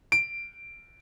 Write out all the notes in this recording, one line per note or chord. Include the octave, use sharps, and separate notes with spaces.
D7